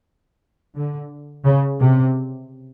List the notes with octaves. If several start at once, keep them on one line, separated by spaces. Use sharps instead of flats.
D3
C#3
C3